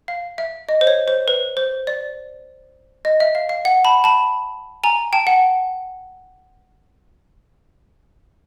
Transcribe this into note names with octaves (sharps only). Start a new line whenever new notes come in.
F5
E5
D#5
C5
C#5
C5
B4
C5
D5
D#5
E5
F5
F5
F#5
A5 B5
A5 B5
G#5 A#5
G5 A5
F#5